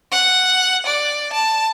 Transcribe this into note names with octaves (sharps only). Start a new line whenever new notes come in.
F#5
D5
A5